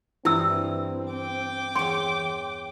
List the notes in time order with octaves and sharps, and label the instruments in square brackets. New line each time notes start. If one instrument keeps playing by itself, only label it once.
[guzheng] G2 E3 [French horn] C4 [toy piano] E4 E6
[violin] G5 D6
[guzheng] E2 C#5 [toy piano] C6